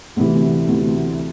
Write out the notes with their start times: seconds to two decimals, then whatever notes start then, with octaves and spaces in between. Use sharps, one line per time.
0.16 D2 C3 E3
0.68 D2 C3 E3